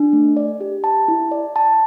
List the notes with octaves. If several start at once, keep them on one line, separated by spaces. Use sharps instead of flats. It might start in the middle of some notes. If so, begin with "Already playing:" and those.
Already playing: D4
A3
D5
G4
A5
E4
D5
A5